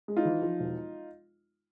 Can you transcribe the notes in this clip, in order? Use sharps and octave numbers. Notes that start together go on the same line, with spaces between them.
G#3
D#4 F4
E3
F3
E1